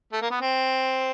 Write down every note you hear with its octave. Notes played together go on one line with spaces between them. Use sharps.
A3
A#3
B3
C4